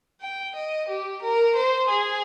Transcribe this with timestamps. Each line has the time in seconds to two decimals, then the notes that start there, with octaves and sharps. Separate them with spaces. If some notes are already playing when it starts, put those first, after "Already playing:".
0.21 G5
0.55 D#5
0.88 G4
1.22 A#4
1.56 C5
1.90 G#4